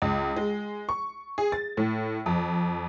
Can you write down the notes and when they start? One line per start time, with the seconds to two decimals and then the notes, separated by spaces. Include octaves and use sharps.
0.02 C#2
0.36 G#3
0.89 C#6
1.38 G#4
1.52 A6
1.77 A2
2.26 F2